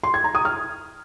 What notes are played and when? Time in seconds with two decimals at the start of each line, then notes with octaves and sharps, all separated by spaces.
0.04 C6
0.14 G#6
0.24 A#5
0.35 D#6
0.45 F6